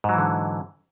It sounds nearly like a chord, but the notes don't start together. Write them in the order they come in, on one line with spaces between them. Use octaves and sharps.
G#2 F#3 E3 D3